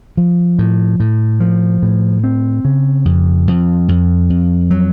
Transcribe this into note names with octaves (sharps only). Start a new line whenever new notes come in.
F3
A2
A2
F3
A2
C4
C#3
F2
F2
F2
F2
F#3